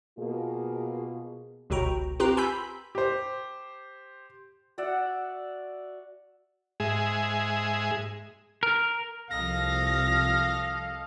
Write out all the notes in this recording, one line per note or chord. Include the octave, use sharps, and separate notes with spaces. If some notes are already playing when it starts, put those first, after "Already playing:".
B2 A#3 F4 G#4
G1 C#2 B2 F#4 G5 A#5
C4 F4 G4 B4 G5 A#5
G#5 B5 C6 E6 G6 B6
G4 C5
F#4 D5 E5 F#5
G#2 G#3 G#4 E5
A#4
C2 F3 A4 D#5 F5 A#6